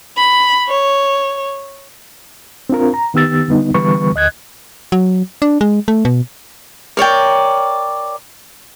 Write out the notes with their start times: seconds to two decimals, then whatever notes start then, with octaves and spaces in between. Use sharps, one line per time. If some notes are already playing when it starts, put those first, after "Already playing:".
0.17 B5
0.68 C#5
2.69 C4 D4 F4 A#4
2.94 A#5
3.14 D#3 B3 G4 E6 A6
3.48 D3 G3 B3 D#4
3.74 D3 E3 G3 B3 B4 C#6
4.15 D2 D#5 F#6 G#6
4.92 F#3
5.42 D4
5.61 G#3
5.88 A3
6.05 B2
6.97 A#4 C#5 D5 G5